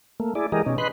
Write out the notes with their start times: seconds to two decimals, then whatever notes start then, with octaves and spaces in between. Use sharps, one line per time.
0.20 A3 A#3
0.35 E4 G#4 D5
0.52 E3 G#3 G4 G#4 A#4 D#5
0.66 B2 C#4 D#4
0.78 B4 D#5 B5 C6 F#6